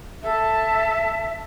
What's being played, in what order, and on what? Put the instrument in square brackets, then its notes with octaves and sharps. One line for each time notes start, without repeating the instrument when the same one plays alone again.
[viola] A4 A5 [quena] E5